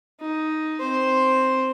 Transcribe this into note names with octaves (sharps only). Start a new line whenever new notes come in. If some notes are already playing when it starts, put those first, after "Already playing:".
D#4
C4 C5